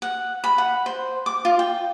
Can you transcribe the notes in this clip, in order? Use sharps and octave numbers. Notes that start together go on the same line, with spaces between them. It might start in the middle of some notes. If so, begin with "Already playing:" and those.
F#5
B5
F#5
C5
D6
F4
G5